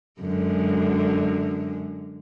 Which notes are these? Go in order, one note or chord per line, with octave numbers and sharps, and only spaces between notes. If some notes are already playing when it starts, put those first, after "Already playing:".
F#2 D3 G#3